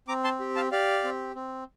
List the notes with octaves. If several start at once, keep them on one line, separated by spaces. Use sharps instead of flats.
C4 A#5 D6
A5 C6
G4
F5 A5
G4 D5 F5
C4
C4